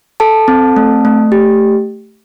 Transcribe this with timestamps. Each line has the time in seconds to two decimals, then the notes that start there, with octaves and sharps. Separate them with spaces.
0.20 A4 A5
0.48 C4
0.76 A3
1.05 A3
1.32 G4